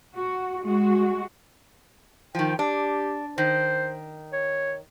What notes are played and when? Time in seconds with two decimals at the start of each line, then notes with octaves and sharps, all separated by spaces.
0.15 F#4
0.63 G#3 F#4
2.35 D#3 F3 G5
2.59 D4 G4
3.38 D#3 C5
4.33 C#5